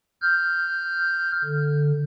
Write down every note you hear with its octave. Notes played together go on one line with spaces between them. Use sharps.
F6 G6
D3